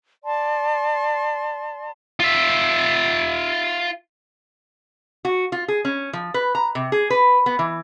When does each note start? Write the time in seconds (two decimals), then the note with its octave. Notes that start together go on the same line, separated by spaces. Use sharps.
0.24 D5 A5 C6
2.20 F4 E5
5.25 F#4
5.52 F4
5.68 G#4
5.85 C#4
6.13 F3
6.34 B4
6.55 A#5
6.75 C3
6.92 G#4
7.10 B4
7.46 B3
7.59 E3